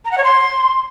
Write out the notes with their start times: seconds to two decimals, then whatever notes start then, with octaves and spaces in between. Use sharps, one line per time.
0.05 A#5
0.11 F#5
0.18 C#5
0.24 C6